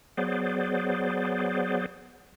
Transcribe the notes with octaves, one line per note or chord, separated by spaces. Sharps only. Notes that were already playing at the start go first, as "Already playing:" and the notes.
F#3 B3 G#4 C5 D5